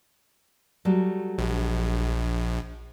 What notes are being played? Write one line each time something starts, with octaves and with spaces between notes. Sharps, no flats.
F#3 G3 A3
A#1